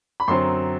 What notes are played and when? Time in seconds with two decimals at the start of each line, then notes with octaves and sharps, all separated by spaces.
0.20 B5
0.28 F#2 D3 F#3 C4 C6